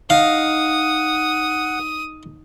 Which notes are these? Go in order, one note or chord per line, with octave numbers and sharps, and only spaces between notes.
D#4 F5 F#5 D#6